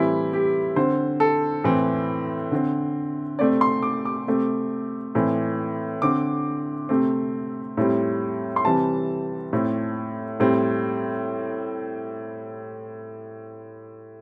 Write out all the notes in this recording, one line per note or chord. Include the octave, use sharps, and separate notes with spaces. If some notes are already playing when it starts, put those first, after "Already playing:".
Already playing: A2 E3 G3 C4 E4
G4
D3 C4 C5
A4
A2 E3 C4
D3 C4
C3 A3 C4 D5
C6
D6
D6
C3 A3 C4
A2 E3 C4
D3 C4 D6
C3 A3 C4
A2 G3 C4
C6
C3 E3 G3 C4 A5
A2 A3 C4
A2 G3 C4